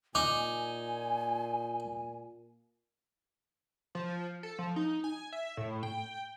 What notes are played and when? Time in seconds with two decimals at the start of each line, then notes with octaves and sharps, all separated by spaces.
0.15 A#2 D#4 G#5 D6
3.95 F3
4.43 A4
4.59 F3
4.76 D#4
5.04 G#5
5.32 E5
5.57 A2
5.83 G5